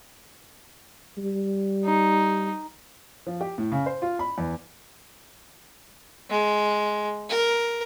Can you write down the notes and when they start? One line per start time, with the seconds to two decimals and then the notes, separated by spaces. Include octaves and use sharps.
1.18 G3
1.85 D#4
3.27 F3
3.41 G4
3.58 A2
3.72 C#3
3.86 C5
4.02 F4
4.19 B5
4.38 E2
6.30 G#3
7.29 A#4